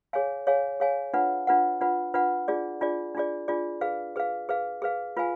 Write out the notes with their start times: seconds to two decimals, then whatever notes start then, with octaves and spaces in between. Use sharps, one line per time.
0.13 G#4 C#5 F5 G#5
0.47 G#4 C#5 F5 G#5
0.80 G#4 C#5 F5 G#5
1.14 D4 F4 B4 F#5
1.47 D4 F4 B4 F#5
1.81 D4 F4 B4 F#5
2.14 D4 F4 B4 F#5
2.48 D4 F4 G#4 D5
2.81 D4 F4 G#4 D5
3.15 D4 F4 G#4 D5
3.48 D4 F4 G#4 D5
3.81 G#4 B4 F5
4.16 G#4 B4 F5
4.49 G#4 B4 F5
4.82 G#4 B4 F5
5.17 F4 B4 F5 G#5